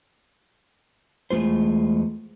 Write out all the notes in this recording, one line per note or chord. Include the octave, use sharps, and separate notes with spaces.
E2 G#3 A3 F4 C5